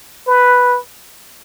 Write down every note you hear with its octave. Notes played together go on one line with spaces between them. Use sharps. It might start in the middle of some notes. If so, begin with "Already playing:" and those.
B4